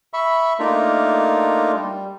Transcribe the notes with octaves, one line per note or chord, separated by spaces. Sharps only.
E5 B5 C#6
A3 A#3 D4 D#4 F4 A#4
G3